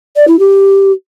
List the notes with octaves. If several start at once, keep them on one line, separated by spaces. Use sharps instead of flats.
D5
E4
G4